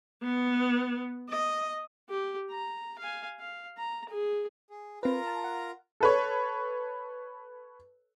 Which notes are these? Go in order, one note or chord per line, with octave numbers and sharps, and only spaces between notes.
B3
D#5
G4
A#5
F5 G#5
F5
A#5
G#4
G#4
C4 F4 A#4 B4 A#5
A5
F#5
A4 B4 C#5